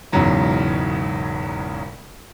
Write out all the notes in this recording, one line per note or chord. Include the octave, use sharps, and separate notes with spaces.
E1 E2 G#2 C#3 F#3 A#5